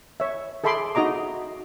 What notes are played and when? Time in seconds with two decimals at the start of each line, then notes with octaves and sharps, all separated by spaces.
0.20 C#5 E5
0.64 G#4 A4 E5 B5 C6 D6
0.95 D#4 F#4 D#5 A#5 D6